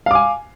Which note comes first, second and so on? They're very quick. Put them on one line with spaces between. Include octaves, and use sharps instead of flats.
F5 D6 G#5